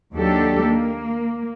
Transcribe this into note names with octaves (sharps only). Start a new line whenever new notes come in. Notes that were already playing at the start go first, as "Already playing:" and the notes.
D#2 F#3 D4 G4 A4
A#3